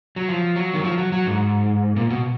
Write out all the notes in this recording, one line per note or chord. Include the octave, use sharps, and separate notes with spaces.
F#3
F3
F#3
D#3
F3
F#3
F#3
G#2
A#2
B2